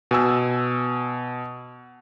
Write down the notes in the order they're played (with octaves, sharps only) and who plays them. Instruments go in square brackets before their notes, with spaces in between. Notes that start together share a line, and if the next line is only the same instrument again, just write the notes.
[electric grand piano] B2 G#5 E6